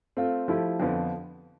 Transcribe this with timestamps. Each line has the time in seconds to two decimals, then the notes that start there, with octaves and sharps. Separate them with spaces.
0.17 A3 C4 F4
0.48 F3 A3 E4 G4
0.80 F2 D3 F3 B3